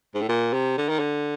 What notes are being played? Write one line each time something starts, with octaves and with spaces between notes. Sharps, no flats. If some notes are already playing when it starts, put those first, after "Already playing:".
G#2
A2
A#2
C3
D3
D#3
D3